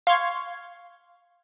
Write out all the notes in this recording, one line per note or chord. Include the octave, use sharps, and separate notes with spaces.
F5 C6 C#6 G#6